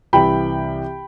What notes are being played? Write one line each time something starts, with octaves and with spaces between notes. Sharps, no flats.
C2 C3 E3 G5 B5